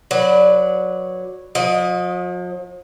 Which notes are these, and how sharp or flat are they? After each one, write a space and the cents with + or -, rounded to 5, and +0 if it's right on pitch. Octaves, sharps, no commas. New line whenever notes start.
F#3 -15 B4 +0 D5 +0
F3 +45 D#5 +0